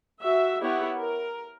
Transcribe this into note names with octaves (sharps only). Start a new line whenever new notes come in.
F#4 E5
B3 E4 G4 C#5 F#5
A#4